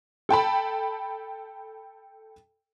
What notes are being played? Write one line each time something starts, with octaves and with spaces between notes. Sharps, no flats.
A4 G5 A5 B5